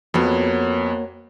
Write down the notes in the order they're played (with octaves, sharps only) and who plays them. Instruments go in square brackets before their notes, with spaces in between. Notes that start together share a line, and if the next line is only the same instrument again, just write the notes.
[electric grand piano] F2 B3 [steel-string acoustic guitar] A#3 F#4 C#5